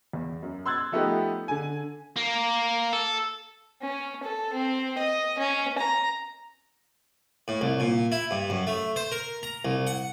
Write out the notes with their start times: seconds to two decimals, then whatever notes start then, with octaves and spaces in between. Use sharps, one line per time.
0.13 E2
0.43 F#2
0.66 C6 E6 F#6 G#6 A6
0.92 F3 A3 B3 D#4 G4
1.48 D3 G#5
2.16 A#3
2.93 A4
3.82 C#4
4.23 A4
4.53 C4
4.98 D#5
5.39 C#4
5.78 A#5
7.48 A2
7.61 C2
7.80 A#2
8.12 E4
8.31 G2
8.50 F#2
8.67 A3
8.96 C5
9.12 A#4
9.43 A#5
9.65 C2
9.87 F#5